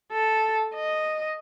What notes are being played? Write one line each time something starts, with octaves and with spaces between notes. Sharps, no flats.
A4
D#5